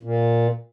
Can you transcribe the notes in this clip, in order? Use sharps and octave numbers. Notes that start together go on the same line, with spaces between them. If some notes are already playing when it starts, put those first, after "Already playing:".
A#2